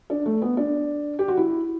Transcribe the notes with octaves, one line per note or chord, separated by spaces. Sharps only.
D4
A3
B3
D4
G4
F#4
E4